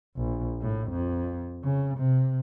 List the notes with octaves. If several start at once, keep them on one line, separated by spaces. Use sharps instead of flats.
A#1
A2
F2
C#3
C3